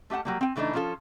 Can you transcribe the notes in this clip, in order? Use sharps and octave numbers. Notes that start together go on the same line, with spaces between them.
A3 G4 E5 F#5 A5
F#3 G3 A#3
C4 G5 G#5
C#3 E3 A3 D4 D#4
F3 C#4 D4 F4 A4